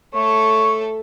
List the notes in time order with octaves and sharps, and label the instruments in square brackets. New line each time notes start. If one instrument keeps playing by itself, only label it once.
[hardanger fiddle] A3 A4 [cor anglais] C#5